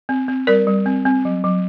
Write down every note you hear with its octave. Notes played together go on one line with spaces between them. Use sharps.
C4
C4
G3 A#4 D5
G3
C4
C4
F#3
F#3